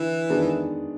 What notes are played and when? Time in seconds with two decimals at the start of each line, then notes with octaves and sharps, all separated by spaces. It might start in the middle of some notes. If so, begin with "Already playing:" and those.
Already playing: D3 E3
0.29 D#3 G#3 B3 D4